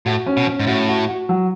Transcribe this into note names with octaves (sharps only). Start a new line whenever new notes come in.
A2 F#4
C#4
B2
C#4
G#2
A2 F#4
F#4
F#4
F#3